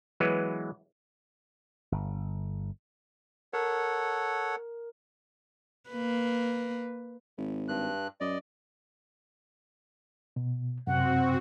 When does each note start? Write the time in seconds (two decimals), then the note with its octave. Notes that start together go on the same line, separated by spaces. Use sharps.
0.20 E3 F#3 G#3 B3 B4
1.92 G1
3.53 A4 A#4 C#5 F#5
5.90 A#3 B4
7.38 G#1
7.68 G2 F#6
8.21 F#2 D5 D#5
10.36 B2
10.87 F#2 C3 C4 F#4 F#5